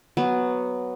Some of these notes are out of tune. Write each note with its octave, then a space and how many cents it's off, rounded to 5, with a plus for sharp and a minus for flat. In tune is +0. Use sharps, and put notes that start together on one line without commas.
F#3 +0 B3 +0